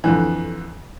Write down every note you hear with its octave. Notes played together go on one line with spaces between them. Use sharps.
F2 D3 E3